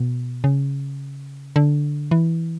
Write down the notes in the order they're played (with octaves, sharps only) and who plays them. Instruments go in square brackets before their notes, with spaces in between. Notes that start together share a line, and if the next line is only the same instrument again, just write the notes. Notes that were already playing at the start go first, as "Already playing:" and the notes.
Already playing: [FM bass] B2
C#3
D3
E3